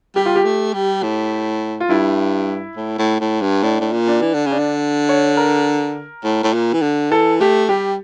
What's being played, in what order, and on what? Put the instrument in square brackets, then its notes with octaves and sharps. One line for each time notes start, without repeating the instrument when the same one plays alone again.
[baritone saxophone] G3 [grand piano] G4
[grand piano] F4
G4
[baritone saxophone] A3
G3
A2
[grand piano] F4
[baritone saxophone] G2 [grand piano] E4
[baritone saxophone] A2
A2
A2
G2
[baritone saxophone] A2 [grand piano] D4
[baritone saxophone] A2
A#2
[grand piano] D4
[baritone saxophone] E3
D3
[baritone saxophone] C#3 [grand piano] D4
[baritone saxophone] D3
[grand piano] C#5
A#4
[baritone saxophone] A2
A2
A#2
E3
D3
[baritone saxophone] E3 [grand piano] A4
[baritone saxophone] A3 [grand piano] G4
[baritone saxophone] G3 [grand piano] G4